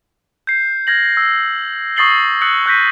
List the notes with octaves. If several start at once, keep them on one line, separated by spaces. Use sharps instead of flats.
G6 C7
F6 G#6 A#6 F#7
E6
C#6 D#6 A6 C7 F#7 G7
D#6 E6 F#6 C7 C#7 F#7
C#6 F#6 G6 A#6 B6 D#7